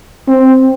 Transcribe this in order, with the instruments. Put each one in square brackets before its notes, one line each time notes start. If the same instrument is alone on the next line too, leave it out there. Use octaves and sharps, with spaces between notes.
[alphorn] C4